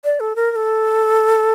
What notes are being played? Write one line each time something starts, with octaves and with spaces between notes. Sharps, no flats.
D5
A4
A#4
A#4
A4